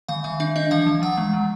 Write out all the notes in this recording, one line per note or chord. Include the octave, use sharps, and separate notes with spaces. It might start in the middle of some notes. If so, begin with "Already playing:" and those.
D#3 F5
D#3 E5
D4 E5
D4 D#5
E3 F5
E3
F3 F#5
G#3
F3